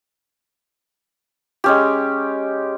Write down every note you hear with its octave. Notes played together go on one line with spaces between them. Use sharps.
G#3 C#4 G4